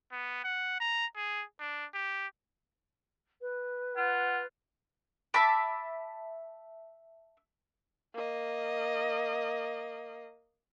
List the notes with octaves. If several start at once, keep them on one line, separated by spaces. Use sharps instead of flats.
B3
F#5
A#5
G#4
D4
G4
B4
F4 F#5
E5 A5 B5 D6
A#3 D#5